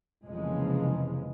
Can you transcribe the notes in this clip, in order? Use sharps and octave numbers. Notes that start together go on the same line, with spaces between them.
F1 C#3 E3 F3 G#3 A#3